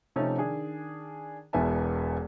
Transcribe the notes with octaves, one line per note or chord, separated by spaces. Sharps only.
C3 F3 A3 C#4 D#4
D#3 D4 G#4
E1 E2 B3 E5 G#5 A5